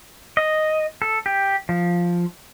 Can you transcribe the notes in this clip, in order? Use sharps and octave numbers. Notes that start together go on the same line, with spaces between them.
D#5
A4
G4
F3